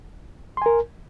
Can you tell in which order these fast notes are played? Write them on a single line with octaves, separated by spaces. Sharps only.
C6 G#5 A#4